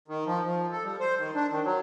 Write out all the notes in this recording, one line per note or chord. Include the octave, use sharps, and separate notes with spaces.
D#3
F3
F3
A4
G3
C5
D#3
D4
D#3
F#3